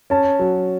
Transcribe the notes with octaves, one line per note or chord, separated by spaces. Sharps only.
C#4 A5
F#3